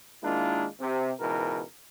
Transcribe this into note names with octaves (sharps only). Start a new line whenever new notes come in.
D#3 G#3 A#3 D4 E4 F4
C3
C#2 G#2 B2 E3 A#4